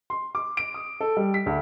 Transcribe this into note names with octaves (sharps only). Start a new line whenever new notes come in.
C6
D6
D7
D#6
A4
G3
B6
D2